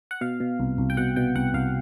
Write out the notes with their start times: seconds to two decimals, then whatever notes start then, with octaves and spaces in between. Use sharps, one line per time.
0.11 F#5
0.21 B2 F5
0.40 B2
0.60 C2
0.78 C2
0.90 G5
0.97 B2 F#5
1.16 B2 G5
1.35 C2 F#5
1.54 C2 F5